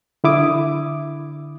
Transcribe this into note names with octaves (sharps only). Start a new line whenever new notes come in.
D3 E4 D6 D#6